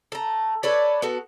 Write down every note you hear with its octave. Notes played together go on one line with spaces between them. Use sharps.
A3 A#5
A4 B4 C#5 D5
B3 F#4 A4